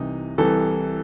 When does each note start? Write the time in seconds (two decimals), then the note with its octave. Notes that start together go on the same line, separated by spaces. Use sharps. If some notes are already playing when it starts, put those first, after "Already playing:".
Already playing: C2 C3 E3 D#4
0.38 C2 C3 E3 A4